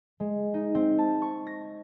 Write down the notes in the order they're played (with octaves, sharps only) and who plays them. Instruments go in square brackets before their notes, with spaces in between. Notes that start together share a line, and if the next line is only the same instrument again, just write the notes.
[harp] G#3
D#4
C4
A5
C#6
A#6